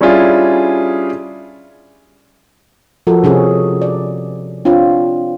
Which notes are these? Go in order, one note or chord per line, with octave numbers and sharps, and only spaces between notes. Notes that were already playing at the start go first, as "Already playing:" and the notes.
G3 C#4 D4 E4 F4 G#4
F3 F#4 A4 A#4
C3 C#4 G#4
D5
C4 D4 F4 C#5